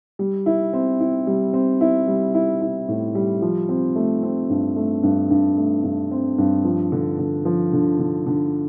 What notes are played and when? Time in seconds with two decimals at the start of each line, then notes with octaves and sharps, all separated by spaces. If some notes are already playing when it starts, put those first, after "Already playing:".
0.19 G3
0.46 E4
0.73 C4
1.00 E4
1.27 G3
1.53 C4
1.81 E4
2.07 G3
2.34 E4
2.61 E4
2.88 A2
3.15 G3
3.42 F3
3.69 C4
3.96 A3
4.23 C4
4.50 G2
4.76 A3
5.03 G2
5.30 G2
5.57 A3
5.84 G2
6.11 C4
6.38 G2
6.65 F3
6.92 D3
7.19 D3
7.45 F3
7.73 D3
7.99 D3
8.26 D3